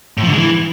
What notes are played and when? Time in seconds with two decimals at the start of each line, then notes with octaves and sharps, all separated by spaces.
0.18 A2
0.23 F3
0.28 D3
0.33 G#3
0.38 E3